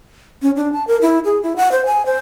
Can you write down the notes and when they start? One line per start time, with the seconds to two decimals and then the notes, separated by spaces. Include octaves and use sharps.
0.42 C#4
0.56 D4
0.73 A5
0.87 A#4
1.01 E4
1.25 G#4
1.43 E4
1.56 F#5
1.72 C5
1.86 G#5
2.06 C5